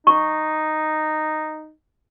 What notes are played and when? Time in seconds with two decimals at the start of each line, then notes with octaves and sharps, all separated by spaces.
0.07 D#4 C#6